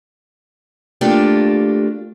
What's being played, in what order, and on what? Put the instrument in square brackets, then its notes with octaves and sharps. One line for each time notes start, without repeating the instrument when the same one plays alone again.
[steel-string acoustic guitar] A3 A#3 D4 F4 G4